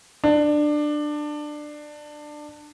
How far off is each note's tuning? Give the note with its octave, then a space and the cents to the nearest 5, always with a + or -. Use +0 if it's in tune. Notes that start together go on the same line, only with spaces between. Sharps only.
D4 +20